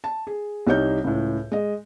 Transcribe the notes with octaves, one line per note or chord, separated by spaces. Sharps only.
A5
G#4
C2 G3 D#4 C#5 G6
C#2 A2
G#3 D#5